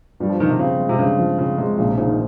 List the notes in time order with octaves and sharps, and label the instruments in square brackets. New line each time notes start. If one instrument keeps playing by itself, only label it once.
[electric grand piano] G2 [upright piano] G3
[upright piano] F3
[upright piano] D#3 [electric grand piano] F3
[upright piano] C3
[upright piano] C#3 [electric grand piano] C4
[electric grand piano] G#3
[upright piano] C3
[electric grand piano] G2 [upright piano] C#3
[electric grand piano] F3
[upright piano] C#3 [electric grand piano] C4
[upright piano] C3 [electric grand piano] G#3
[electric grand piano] A#1 [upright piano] C#3
[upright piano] C3
[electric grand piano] G#2 [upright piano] C#3
[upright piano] D#3